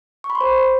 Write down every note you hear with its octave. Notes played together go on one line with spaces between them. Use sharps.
C#6
B5
C6
C5